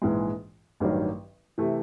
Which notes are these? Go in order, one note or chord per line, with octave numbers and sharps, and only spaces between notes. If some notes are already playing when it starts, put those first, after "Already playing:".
A#1 G#2 E3 G#3
A1 G2 D#3 F#3
C3 E3 A3